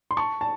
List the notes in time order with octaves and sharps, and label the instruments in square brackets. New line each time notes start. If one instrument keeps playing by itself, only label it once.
[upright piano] C6
A5 C#6
A5